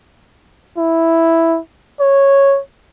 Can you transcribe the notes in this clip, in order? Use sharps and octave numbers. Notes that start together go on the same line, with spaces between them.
E4
C#5